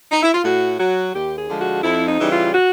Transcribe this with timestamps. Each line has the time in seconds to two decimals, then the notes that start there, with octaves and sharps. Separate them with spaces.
0.12 D#4
0.23 E4
0.34 F4
0.44 A2 F#4
0.79 F#3 F#4
1.14 D#2 G4
1.38 G#4
1.48 D3 F3 G#3
1.61 F#4
1.83 F2 E4
2.07 D#4
2.19 C#3 E3 G3
2.30 F4
2.54 F#4